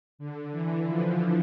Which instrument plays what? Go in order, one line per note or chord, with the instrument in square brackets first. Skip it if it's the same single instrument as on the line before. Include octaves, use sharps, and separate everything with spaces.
[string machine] D3
E3
F3